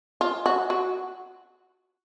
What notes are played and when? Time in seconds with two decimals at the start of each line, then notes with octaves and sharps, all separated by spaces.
0.21 F4
0.46 F#4
0.70 F#4